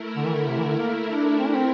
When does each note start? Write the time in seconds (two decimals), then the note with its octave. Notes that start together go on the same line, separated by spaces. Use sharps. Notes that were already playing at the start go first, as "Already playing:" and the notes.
Already playing: A3 E4 A#4
0.16 D3
0.26 E3
0.34 D3
0.47 C3
0.59 E3
0.63 D3
0.78 A#3
1.08 D4
1.39 C4
1.47 D4
1.55 C4